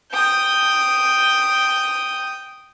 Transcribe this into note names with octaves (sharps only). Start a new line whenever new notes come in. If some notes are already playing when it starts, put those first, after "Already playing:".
G5 D#6